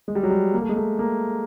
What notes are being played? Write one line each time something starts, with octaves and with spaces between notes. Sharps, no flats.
G#3
G3
F#3
G3
A#3
A3
G#3
A3
A#3